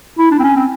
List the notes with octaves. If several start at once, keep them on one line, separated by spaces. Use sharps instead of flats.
E4
D4
C4
C#4
C4